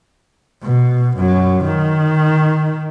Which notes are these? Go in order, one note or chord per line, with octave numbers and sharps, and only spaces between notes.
B2
F#2 F#3
D#3